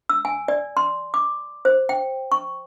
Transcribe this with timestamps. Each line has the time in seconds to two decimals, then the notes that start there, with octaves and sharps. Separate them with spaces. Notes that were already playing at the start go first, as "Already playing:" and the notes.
0.09 E6
0.25 G#5
0.48 D5
0.77 C6
1.14 D6
1.65 C5
1.89 G5
2.32 C#6